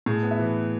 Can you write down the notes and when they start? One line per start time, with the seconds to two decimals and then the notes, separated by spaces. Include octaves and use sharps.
0.06 A2 G#4
0.23 B3
0.31 E5
0.39 E3